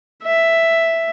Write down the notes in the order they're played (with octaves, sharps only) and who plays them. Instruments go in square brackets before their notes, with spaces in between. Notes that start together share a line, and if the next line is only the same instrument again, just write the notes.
[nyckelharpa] E5